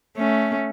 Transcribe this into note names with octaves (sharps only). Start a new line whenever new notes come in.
A3 C#4